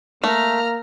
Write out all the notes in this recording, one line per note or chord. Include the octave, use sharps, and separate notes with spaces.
A3 A#3 A#5 F6